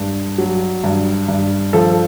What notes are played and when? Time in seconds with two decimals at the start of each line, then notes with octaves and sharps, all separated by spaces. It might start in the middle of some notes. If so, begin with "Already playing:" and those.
Already playing: G2
0.38 F#3
0.84 G2
1.28 G2
1.73 F3 A4